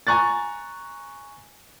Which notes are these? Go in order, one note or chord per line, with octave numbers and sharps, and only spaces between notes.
G#5 A#5 C#6 F#6 A6